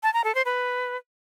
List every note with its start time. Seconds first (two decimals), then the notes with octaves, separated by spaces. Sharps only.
0.03 A5
0.14 A#5
0.24 A4
0.35 C5
0.45 B4